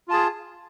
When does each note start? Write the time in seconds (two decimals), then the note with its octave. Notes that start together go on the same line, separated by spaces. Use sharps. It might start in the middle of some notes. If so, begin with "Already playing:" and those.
0.08 F4
0.11 A5
0.13 G#4